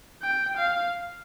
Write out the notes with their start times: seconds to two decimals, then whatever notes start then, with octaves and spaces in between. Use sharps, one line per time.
0.22 G5
0.58 F5